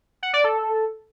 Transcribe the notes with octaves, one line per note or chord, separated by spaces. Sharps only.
F#5
D5
A4